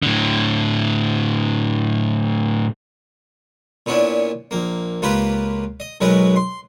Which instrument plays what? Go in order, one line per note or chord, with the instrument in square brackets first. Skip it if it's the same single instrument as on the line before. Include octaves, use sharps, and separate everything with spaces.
[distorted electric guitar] A2 D3
[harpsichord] A#2 B3 C#4 D4 E4
A#1 A#3
C#2 A#3 F4 G4 B4
D#5
B1 B2 F#3 G#3 A#4 B4
C6